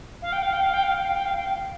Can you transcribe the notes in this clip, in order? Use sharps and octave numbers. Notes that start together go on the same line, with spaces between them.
F5
G5
F5
G5
F5
G5
F5
G5
F5
G5
F5
G5
F5